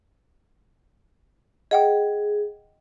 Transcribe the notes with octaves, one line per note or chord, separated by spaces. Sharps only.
G#4 D#5 F#5 G5